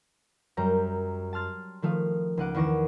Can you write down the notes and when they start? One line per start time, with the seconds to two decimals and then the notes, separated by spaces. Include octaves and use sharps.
0.57 F#2 G3 A#5 G6
1.33 A5 C6 F6 A6
1.82 D#3 F3 A3 F5 D#6
2.37 C#2 D#4 D#5 F#5 D6
2.54 E2 D#3 C#6 D6 A#6 E7